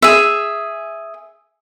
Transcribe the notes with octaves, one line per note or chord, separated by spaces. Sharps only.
G#4 E5